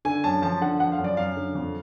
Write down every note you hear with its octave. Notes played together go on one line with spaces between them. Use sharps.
D3 G#5
F#2 A5
F3 A5
D3 F#5
F3 F#5
F5
F#2
D5
F#2 F5
D3
F2